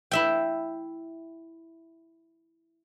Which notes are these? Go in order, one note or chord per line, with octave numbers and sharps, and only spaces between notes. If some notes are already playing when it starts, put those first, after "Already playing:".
E4 E5 G5